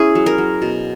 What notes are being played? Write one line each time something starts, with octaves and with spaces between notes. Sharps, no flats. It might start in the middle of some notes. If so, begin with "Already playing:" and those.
Already playing: C#4 E4 G#4
F#3
A#4
F#3
B2